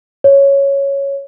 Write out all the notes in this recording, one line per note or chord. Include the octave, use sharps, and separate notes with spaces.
C#5